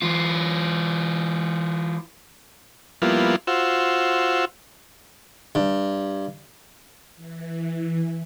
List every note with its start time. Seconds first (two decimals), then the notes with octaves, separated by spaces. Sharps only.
0.02 E3 F4
3.02 F3 G3 A#3 B3 E4 F4
3.47 F4 F#4 C5 E6
5.55 G2
7.16 E3